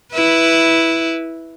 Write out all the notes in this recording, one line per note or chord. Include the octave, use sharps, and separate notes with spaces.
E4 B4